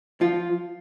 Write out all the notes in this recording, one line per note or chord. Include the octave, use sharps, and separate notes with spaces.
F3 F4